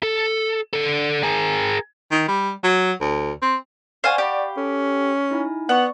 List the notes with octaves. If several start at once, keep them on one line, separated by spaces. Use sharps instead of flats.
A4
D3 A4
G#4 A#4
D#3
G3
F#3
D2
C4
C5 D5 F5 F#5 G#5 C#6
G4 D5 F5 B5
C#4 A4
D#4 E4 G#5
B3 D5 F#5 C#6